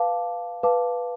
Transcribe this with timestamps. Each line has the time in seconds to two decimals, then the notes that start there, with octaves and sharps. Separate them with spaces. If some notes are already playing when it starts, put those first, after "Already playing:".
Already playing: B4 F5 A5 D6
0.63 B4 F5 A5 D6